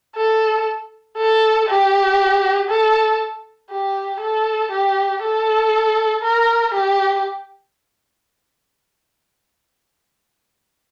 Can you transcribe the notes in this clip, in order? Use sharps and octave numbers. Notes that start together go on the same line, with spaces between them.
A4
A4
G4
A4
G4
A4
G4
A4
A#4
G4